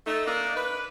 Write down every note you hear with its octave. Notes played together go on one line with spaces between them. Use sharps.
A3 D#4
A#3 D4 D#4
B4